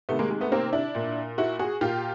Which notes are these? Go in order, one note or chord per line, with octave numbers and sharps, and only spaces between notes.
C3 D#3 A3 B3
G#3 A#3
G#3
A3 B3
A#3 C4
D4 E4
A#2
E4 F#4
F#4 G#4
A#2 F4 G4